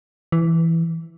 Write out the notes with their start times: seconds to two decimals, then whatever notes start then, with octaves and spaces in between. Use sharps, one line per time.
0.32 E3